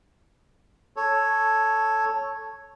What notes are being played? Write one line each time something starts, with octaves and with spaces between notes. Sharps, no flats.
A4 C#5